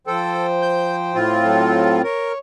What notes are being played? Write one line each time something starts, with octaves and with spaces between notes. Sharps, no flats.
F3 A4 C5 G5
G6
A2 C4 F4
F#3 A4
A#4 C#5